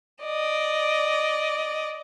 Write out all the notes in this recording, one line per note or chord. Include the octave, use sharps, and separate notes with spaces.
D5 D#5